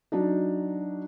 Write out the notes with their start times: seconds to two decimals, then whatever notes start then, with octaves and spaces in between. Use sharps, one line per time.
0.12 F#3 D4 D#4